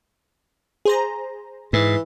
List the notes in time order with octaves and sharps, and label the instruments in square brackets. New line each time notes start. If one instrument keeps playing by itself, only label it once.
[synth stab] G#4 C5 A#5
[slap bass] G#2 [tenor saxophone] E3